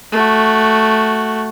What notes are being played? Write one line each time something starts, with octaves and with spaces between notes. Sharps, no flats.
A3 F#4